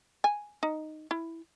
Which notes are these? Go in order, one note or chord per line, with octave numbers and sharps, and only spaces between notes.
G#5
D#4
E4